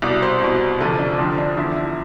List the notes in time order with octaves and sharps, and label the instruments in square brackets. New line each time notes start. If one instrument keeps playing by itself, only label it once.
[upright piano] C2 B2 D5
C5
C2 B2
D2 C3 F3 A4
D4
F2 D3 F3 C4
D4
E2 D3 F3 E4
E4